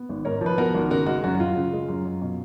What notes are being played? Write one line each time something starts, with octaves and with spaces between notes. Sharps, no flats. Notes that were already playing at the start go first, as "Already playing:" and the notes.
Already playing: B3
G#1
G#2 A#4 C#5
F3
B4
B3 F#4 A#4
G#1
C#3 F#4 A#4
G#3 F#4
F#2 F#4
F#4
F#2 F4
C#3
G#3
F#2
F#2
B2